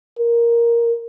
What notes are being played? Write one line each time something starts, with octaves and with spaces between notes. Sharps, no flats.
A#4